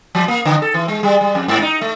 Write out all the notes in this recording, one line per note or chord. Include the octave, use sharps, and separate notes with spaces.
F3
A#3
D3
A4
E3
G#3
G3
G3
F2
G#2
D#4
A3